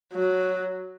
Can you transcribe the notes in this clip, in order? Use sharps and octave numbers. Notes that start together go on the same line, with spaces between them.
F#3